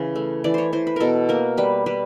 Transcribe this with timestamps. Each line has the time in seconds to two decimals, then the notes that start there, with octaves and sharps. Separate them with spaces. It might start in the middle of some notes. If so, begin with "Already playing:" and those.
Already playing: C#3 E3
0.16 A3
0.44 E3 D5
0.54 C5 C#5
0.73 E3 C5
0.87 B4
0.96 B2 A4 A#4
1.29 A#3 A#4
1.57 G3 B4
1.86 G3 B4